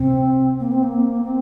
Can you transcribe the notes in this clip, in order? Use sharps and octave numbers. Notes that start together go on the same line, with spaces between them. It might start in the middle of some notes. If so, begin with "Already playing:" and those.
Already playing: C3 C4
A#3
C4
A#3
C4